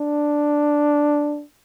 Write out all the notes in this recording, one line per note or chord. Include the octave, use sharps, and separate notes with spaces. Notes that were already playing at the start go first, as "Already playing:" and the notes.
Already playing: D4